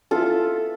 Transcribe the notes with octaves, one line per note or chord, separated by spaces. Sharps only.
B3 E4 F4 A4